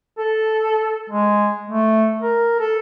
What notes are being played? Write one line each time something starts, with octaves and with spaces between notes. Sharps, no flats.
A4
G#3
A3
A#4
A4